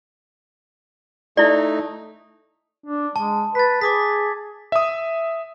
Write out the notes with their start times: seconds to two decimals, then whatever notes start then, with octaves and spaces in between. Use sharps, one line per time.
1.37 A3 D#4 E4 D5
2.86 D4
3.16 G#3 A5
3.55 B4 A6 B6
3.81 G#4 D6 D#6 B6
4.72 E5 D#6